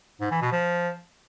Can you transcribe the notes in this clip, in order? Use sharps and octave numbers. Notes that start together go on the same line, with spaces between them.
G#2
E3
B2
F3